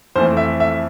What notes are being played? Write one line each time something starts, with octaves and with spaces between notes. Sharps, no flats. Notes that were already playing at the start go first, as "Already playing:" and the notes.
F2 E3 A3 C5
E5
E5